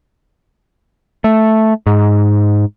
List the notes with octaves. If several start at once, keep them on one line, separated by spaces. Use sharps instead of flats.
A3
G#2